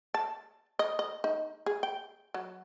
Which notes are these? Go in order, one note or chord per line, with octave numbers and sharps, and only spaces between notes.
A5
D#5
D#5
D#4
G#4
G5
F#3